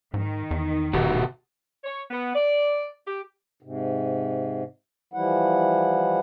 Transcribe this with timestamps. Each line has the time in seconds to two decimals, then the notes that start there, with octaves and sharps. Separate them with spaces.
0.14 G#2 D#3
0.51 E2
0.93 D#1 B2 F#4 G4
1.84 C#5
2.11 B3
2.34 D5
3.07 G4
3.63 G#2 C3
5.13 E3 F3 G3 E4 F#5